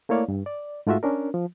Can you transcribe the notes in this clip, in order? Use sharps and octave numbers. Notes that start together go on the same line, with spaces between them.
A3 A#3 E4 C#5 D5 F5
G2
D5
G#2 A3 F4 F#4 E5
C#4 D4 A#4
F3